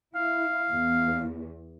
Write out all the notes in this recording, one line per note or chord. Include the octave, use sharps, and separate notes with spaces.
E4 F5
E2